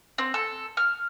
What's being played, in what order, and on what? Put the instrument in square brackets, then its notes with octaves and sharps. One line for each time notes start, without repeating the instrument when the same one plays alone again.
[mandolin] C4
A4
F6